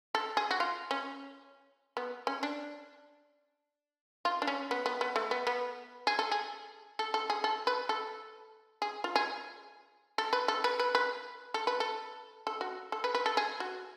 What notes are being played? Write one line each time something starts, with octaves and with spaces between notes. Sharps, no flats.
A4
G#4
F#4
F4
C#4
B3
C#4
D4
F4
D4
C#4
B3
B3
B3
A3
B3
B3
G#4
A4
G#4
A4
A4
G#4
A4
B4
A4
G#4
F4
G#4
A4
B4
A4
B4
B4
B4
A4
B4
A4
A4
F#4
A4
B4
B4
A4
G#4
F#4